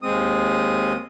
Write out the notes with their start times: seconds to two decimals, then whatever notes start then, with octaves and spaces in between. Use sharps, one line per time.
0.02 D#2 G#3 C4 D#6